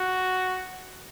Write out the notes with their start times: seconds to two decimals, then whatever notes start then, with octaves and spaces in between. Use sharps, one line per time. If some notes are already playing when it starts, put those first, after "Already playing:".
Already playing: F#4